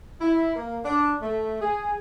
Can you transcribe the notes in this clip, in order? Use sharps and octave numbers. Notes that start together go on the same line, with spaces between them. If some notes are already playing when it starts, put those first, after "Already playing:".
E4
A#3
D4
A3
G#4